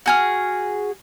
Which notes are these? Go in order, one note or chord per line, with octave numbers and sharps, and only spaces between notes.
F#4 G#4 F6